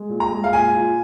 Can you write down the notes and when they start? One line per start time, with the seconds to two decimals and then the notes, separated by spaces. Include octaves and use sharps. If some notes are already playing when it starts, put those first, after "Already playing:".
Already playing: G#3
0.09 A#2
0.20 A#5
0.31 G#3
0.44 F5
0.53 A#2 G#5
0.75 F4